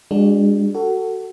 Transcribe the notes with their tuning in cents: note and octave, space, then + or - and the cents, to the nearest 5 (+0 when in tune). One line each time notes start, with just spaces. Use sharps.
G#3 -30 D4 +0 F#4 +0
F#4 +20 A4 +20